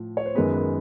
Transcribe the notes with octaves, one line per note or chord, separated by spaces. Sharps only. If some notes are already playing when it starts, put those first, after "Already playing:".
Already playing: A2 F3
C#5
C5
F#2 D#3 G#3 B3 B4
B4